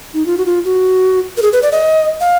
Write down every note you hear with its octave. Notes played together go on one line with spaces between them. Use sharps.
D#4
F4
F#4
F4
F#4
A#4
G#4
B4
D5
D#5
F5